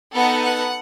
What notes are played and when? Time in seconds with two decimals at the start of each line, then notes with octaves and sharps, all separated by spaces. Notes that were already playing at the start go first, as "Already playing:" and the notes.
0.15 B3 D#4 A4 F#5
0.42 F#5